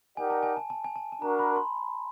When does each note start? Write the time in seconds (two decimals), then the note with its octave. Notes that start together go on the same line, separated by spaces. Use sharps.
0.17 D#4 G4 A#4 D5 F#5 G#5
0.30 A5
0.43 G#5
0.57 A5
0.70 A5
0.84 G#5
0.96 A5
1.12 A5
1.21 D4 F#4 A#4 A#5
1.39 B5
1.56 C6